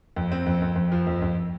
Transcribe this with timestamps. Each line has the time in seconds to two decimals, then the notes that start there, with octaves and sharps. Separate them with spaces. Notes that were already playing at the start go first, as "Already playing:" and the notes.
0.16 F2
0.32 C4
0.46 F2
0.62 F2
0.76 F2
0.92 F3
1.07 F2
1.22 F2